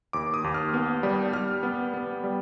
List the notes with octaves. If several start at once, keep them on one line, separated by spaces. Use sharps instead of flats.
D#2 D6
D#6
D#2
F6
B3
G3
G3 F6
B3
B3
G3